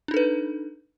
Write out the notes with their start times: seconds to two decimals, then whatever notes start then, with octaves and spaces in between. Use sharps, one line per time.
0.08 D4
0.11 D#4
0.14 A4
0.17 B4